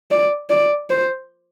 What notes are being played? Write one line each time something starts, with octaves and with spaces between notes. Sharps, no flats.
D5
D5
C5